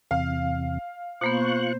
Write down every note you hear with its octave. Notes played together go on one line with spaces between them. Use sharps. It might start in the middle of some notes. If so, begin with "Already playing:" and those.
E2 C3 F5
B2 A#3 B3 F4 C5 C#6 F#6